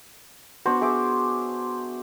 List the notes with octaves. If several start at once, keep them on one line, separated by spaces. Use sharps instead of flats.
B3 D4 F#4 C5
G#4 E5 D6